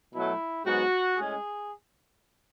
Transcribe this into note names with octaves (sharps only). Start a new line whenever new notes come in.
B2 F#3 A3 E4
G#2 F#3 B3 F#4
A2 G#3 C#4 G#4